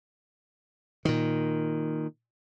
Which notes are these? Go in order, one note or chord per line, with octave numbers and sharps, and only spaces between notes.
A#2 D#3